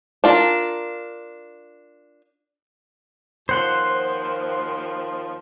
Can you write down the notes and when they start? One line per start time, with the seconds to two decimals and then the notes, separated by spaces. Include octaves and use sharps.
0.24 D4 F4 A#4
3.49 D#2 F3 C5 F#5 C6